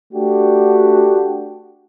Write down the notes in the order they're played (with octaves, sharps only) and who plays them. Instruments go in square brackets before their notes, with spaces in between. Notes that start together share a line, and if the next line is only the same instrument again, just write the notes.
[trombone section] A3 D4 F#4 G4